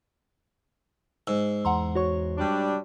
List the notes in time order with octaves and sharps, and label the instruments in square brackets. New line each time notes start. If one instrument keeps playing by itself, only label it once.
[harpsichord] G#2 [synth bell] E6
[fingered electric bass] E2 [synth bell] F#5 A#5 C6
[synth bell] F#4 C#5 C#6
[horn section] G3 D4